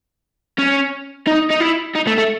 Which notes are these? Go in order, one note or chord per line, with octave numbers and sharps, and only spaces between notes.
C#4
D#4
D#4
E4
D#4
A3
A3